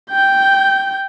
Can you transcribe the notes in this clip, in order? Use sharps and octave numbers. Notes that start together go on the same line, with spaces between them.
G5 G6